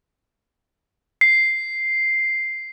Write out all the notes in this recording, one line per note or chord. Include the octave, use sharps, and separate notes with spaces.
C7